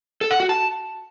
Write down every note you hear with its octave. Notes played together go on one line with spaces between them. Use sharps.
A4
F#5
F#4
A5